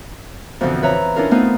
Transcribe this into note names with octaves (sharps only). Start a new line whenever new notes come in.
F2 B2 D3 E3 F3
B4 C#5 E5 A#5
C#4 D4 E4 F4 A#4
A3 B3 C4 D#4 F4